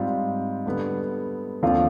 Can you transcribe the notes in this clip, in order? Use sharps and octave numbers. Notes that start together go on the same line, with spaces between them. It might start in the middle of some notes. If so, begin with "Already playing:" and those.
Already playing: G#2 G3 C4 F4
D3 G3 B3
D#2 D3 F3 C4 F4